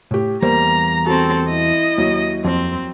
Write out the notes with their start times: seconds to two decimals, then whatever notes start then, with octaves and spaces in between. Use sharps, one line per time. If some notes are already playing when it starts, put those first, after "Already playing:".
0.11 A2 G4
0.42 E2 G3 A#3 C5 A#5
1.06 C4 F#4 A4
1.49 E4 D#5
1.98 D#2 F#3
2.45 F2 C4